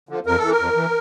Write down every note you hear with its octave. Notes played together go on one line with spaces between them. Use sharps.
D3 F3
F2 A#4
E3 A4
A#4
F2
E3